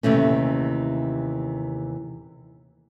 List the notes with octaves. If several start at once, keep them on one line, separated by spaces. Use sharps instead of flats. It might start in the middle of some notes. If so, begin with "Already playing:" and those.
D#2 C3 E3 A3 C#4